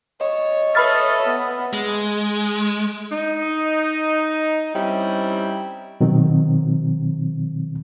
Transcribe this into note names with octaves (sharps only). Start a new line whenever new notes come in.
C#5 D#5
A4 B4 D#5 E5 B5 D#6 F6 A6
B3
G#3
D#4
G3 C4 C#4 D#4 E4
B2 D#3 F#3 C4